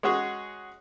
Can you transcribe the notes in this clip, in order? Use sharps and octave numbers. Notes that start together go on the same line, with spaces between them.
G#3 C#4 F#4 G#4